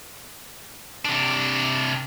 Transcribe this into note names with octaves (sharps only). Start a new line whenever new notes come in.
C3 D4